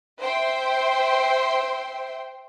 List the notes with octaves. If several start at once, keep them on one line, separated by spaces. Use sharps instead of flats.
C5 E5 G5 C6